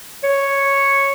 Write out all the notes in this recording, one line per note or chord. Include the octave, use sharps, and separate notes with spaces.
C#5